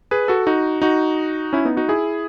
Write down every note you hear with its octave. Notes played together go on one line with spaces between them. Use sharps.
G#4 B4
F#4 A4
D#4 F#4
D#4 F#4
C#4 E4
B3 D#4
D#4 F#4
E4 G#4